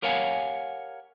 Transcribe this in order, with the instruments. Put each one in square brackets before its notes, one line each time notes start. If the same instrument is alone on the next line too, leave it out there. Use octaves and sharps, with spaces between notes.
[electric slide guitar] G4 A#4 C#5 F5 F#5 G#5